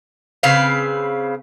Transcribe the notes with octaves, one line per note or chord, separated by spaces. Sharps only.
C#3 C4 B4 F5